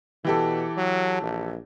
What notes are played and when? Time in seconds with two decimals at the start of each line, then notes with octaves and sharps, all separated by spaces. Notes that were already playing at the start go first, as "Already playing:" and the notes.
0.25 B2 E3 G4 A4
0.77 F#3
1.23 A#1